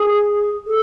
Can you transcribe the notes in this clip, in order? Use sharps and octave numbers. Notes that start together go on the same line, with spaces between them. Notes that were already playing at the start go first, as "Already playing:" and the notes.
Already playing: G#4
A4